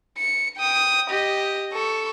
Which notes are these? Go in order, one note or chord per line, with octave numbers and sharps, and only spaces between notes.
C#7
G5 D#6
G4 D#5
A4 C#6